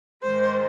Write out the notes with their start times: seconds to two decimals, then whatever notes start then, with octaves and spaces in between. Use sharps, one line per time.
0.23 G#2 D#3 G#3 C5